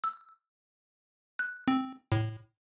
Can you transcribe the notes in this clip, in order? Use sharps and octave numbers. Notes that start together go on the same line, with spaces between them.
E6
F#6
C4
A2